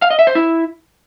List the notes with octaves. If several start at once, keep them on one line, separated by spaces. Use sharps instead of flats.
F5
D#5
E5
C5
E4